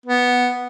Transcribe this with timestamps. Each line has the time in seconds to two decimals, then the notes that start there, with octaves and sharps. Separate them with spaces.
0.06 B3